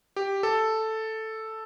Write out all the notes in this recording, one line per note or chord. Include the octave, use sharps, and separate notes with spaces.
G4
A4